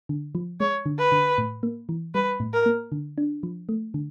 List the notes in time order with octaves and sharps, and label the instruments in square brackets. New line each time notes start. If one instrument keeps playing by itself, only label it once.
[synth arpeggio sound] D3
F3
[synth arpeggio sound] G#3 [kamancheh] C#5
[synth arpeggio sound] D3
[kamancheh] B4
[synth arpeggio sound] D3
A2
A#3
E3
[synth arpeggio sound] G3 [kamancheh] B4
[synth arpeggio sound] A2
[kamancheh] A#4
[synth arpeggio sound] A#3
D3
D4
F3
A3
D3